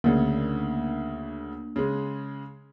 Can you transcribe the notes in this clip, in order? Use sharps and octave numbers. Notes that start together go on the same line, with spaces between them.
D2 C#3 A#3 D4
C#3 G#3